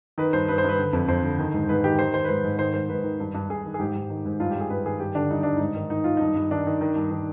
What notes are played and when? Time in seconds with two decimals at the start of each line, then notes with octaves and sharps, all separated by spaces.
0.18 D#3 B4
0.33 G2 C5
0.48 G2 B4
0.58 C5
0.64 G2 B4
0.79 D3
0.93 F2
1.08 F2 C5
1.24 D3
1.39 D#3
1.54 G#2
1.69 G#2 B4
1.84 D#3 G4
1.99 D#3 C5
2.14 D#3 C5
2.24 B4
2.29 G#2 C5
2.44 G#2
2.59 D#3 C5
2.74 G#2 C5
2.89 G#2 B4
3.04 D#3
3.20 G2
3.34 G2
3.49 G2 G#4
3.65 D#3
3.74 G#4
3.79 G#2 G4
3.95 G#2
4.10 D#3
4.25 G#2
4.40 G2 F4
4.51 G2 G4
4.61 G#4
4.70 G2 B4
4.85 D#3 G#4
5.00 G2 G4
5.15 D3 D4
5.30 G2 D#4
5.43 G2 D4
5.57 G#2 D#4
5.75 D#3
5.90 D#3 D#4
6.04 D#3 F4
6.17 G2 D#4
6.35 G2
6.51 D#3 D4
6.66 D#3
6.81 D#3
6.95 G2
7.11 D#3